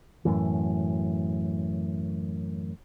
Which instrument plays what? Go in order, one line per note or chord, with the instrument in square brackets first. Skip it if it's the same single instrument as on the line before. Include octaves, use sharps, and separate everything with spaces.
[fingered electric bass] F#2 A2 E3